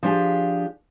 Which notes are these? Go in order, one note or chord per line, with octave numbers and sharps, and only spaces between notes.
F3 D4 G4 G#4